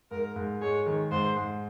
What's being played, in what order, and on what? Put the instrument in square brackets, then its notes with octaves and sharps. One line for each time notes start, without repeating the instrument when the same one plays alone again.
[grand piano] G#2 [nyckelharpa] A#4
[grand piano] G#2
[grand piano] G#3 [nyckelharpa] C#5
[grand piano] D#3
[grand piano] G#2 [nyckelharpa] C5
[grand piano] G#2